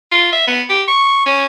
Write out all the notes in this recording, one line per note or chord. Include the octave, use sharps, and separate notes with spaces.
F4
E5
B3
G4
C#6
C#4